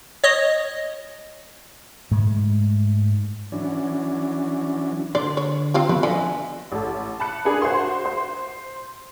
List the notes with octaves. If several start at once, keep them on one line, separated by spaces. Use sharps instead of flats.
C#5 D#5
G#2 G#3 A3
E3 F#3 C#4 D4
D3 D5 C6
C#5
C4 F4 G4
F3 B3 F#4
D3 D#5 E5 G#5
A1 A4
A5 B5 F#6 C#7
D4 G#4 A#4 B4
F#4 C5 F#5 C6
C5 C6